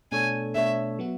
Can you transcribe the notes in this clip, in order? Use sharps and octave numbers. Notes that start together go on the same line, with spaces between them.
B2 A3 D4 A4 C#5 G#5
B2 A3 D4 A4 C#5 E5
F#3 B3 F#4